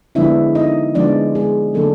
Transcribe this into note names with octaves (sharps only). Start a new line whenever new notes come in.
D3 F3 G#3 B3 D4 E4 E5
D#4 D#5
D3 F3 G#3 B3 D4 D5
G#3 G#4
D3 F#3 A3 A#3 D4 A4